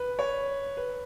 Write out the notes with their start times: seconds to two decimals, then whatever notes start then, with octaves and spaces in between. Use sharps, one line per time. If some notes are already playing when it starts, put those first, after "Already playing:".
Already playing: B4
0.19 C#5
0.77 B4